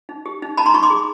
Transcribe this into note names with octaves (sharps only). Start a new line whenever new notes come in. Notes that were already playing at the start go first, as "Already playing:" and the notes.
D#4
G4
D#4
D#4 A5 B5
A#5 C6
D#4 B5 C#6
C6 D6
G#4